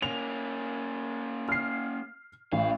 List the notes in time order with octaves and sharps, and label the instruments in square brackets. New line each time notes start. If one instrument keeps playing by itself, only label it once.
[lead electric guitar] A#3 C#4 [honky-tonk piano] F7
[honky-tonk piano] F6 C7
[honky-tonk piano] A1 [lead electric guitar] F#2 F5